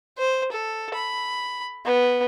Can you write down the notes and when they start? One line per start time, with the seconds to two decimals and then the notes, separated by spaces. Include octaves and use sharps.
0.18 C5
0.52 A4
0.95 B5
1.86 B3